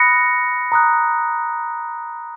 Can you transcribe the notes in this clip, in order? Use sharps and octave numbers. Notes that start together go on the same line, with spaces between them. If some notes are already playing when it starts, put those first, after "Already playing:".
Already playing: B5 D#6 F#6 A#6 C#7
A#5 D#6 F#6